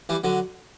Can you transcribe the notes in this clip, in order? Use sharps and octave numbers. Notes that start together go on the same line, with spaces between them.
E3 G3
D3 F#3